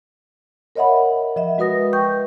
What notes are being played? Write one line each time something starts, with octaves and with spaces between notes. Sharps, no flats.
A#4 C#5 D#5 E5 F#5 B5
F3 D#5 E5
G#3 F#4 B4 D#6 A#6
G5 C#6 G6